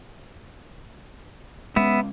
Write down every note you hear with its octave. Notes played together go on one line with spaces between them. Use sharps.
G#3 B3 C#4 E5